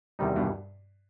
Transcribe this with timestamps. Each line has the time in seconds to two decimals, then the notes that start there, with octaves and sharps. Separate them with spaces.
0.19 E2 C3 D#3 G3 D#4
0.36 G2 B2